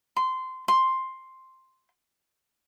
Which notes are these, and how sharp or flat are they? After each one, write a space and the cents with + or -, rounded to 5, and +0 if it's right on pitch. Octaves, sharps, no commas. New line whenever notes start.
C6 -15
C6 +5